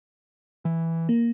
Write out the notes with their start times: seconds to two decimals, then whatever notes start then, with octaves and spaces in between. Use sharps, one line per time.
0.65 E3
1.09 A#3